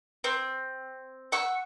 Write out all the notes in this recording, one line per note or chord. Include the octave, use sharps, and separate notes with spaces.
C4
F#5 C#6 E6